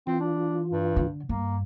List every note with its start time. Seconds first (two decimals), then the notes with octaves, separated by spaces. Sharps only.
0.07 E3 C4 F4
0.20 D4
0.72 G2
0.96 D3
1.29 G2 A#3